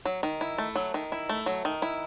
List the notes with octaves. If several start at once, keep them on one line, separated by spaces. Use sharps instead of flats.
F#3
D#3
E4
A3
F#3
D#3
E4
A3
F#3
D#3
E4